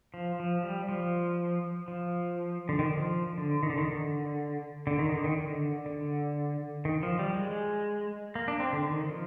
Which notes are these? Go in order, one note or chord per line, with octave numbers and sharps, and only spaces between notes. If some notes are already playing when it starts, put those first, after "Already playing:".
F3
F3
G3
F3
F3
D3
D#3
F3
D3
D#3
D3
D#3
D3
D3
D#3
D3
D#3
D3
D3
D#3
F3
G3
G#3
A#3
D4
C4
D3
D#3
F3